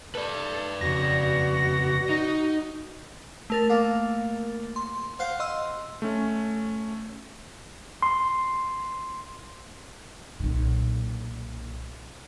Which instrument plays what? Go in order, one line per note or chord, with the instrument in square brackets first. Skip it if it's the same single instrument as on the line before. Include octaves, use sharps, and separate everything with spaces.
[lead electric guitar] A4 [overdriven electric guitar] B4 D5
[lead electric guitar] F2 C#3 [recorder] F#4 [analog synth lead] A#6
[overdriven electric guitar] D#4
[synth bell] A3 A#4 A6
[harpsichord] A#3
[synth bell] C6
[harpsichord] C5 F5 F#5
[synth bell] D#5 C6 E6
[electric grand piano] A3 C#4
[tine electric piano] C6
[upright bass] B1 A#2